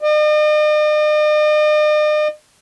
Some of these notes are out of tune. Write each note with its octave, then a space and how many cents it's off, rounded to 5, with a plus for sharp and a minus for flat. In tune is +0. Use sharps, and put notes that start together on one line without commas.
D#5 -45